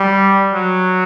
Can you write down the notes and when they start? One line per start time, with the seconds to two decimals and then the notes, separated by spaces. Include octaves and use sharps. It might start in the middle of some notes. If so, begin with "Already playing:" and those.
Already playing: G3
0.54 F#3